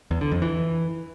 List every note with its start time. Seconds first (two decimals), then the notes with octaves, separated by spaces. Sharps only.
0.11 E2
0.21 D3
0.32 F2
0.42 E3